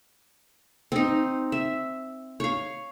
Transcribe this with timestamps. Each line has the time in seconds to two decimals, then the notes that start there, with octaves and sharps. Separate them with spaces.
0.92 C4 D#4
1.52 E5
2.40 C#5 F5